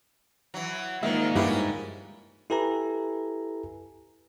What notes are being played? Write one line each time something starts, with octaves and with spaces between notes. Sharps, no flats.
E3 F#3
A#2 D#3 F3 G#3 A#3 D#4 E5
G2 C#4 E4 F#4 G4
E4 G4 A4 B4 G#5 A#5